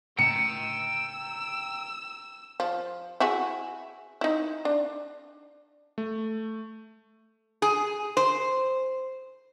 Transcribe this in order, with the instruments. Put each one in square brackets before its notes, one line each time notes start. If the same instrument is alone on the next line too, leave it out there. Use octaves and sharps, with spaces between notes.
[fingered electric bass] A2 C#3 [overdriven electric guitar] G5 A#5 [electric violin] E6 [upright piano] C#7
[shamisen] F3
E4 F#4 G#4
D#4 E4
D4
[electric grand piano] A3
[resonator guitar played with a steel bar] G#4
C5